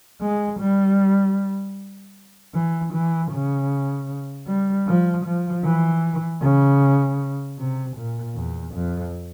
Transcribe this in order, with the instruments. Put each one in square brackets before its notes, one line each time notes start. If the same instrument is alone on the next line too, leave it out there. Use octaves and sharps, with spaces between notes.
[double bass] G#3
G3
E3
E3
C#3
G3
F3
F3
E3
C#3
C3
A#2
E2
F2